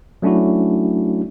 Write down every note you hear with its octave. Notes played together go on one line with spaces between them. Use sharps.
F#3 A3 C#4 D4 E4 F#4